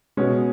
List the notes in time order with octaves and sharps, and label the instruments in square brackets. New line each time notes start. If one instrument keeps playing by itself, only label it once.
[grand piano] B2 G#3 C#4